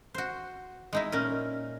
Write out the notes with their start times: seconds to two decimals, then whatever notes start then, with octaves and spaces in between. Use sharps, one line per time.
0.14 F#4 C5
0.93 G#3 D#4 E4
1.12 A#2 C#4 A#4